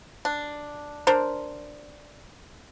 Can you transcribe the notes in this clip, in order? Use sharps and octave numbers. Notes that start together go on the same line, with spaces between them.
D4
D4 A#4 C5